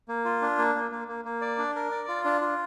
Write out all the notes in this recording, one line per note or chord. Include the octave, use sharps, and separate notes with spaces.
A#3
F4
D4
A#3
A#3
A#3
A#3
A#3
D5
D4
A#4
D5
F4
D4
F4